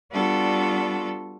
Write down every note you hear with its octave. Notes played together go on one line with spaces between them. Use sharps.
G3 B3 D4 F4 F#4 A4